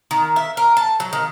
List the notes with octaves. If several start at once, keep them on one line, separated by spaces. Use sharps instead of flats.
D#3
E5
A#4
A5
F#3
D#3